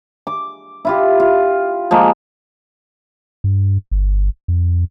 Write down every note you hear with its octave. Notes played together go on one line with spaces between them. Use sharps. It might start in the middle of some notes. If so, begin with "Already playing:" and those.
D6
E4 F4 G4
F4
F3 G#3 A#3
G2
G1
F2